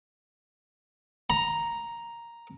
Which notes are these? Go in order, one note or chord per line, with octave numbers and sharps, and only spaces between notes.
A#5